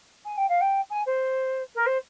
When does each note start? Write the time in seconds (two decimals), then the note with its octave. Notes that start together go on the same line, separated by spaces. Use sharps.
0.25 G#5
0.37 G5
0.49 F5
0.61 G5
0.90 G#5
1.06 C5
1.75 A#4
1.86 C5